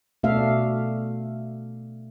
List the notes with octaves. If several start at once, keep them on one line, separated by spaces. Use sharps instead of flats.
B2 A3 D4 E5 F5